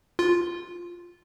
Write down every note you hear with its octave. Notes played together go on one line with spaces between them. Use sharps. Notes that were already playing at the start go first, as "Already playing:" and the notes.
F4